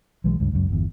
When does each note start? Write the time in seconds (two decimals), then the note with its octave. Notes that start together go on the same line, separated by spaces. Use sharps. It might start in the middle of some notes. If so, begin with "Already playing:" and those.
0.24 B1 E3 F#3 G#3
0.40 C#2 G2
0.52 C#2 F#2
0.68 G1 E2